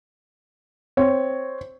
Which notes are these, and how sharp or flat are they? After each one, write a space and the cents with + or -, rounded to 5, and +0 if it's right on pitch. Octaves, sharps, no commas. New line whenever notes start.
C4 +0 C#5 +0